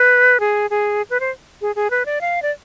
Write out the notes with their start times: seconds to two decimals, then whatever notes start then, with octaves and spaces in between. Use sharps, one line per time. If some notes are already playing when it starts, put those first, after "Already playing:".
Already playing: B4
0.40 G#4
0.70 G#4
1.10 B4
1.20 C5
1.62 G#4
1.76 G#4
1.90 B4
2.06 D5
2.21 F5
2.42 D5